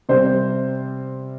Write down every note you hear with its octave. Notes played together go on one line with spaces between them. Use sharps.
C3 G3 C4 C5